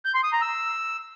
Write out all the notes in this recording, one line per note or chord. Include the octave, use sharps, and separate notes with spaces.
G6
C6
D#6
A#5
E6